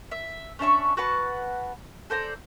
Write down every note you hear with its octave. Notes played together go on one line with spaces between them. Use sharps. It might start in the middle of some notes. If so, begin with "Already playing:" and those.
E5
C#4 D4 E5 C#6
F#4 B4 F#5 A5
A4 C5 D5 A#5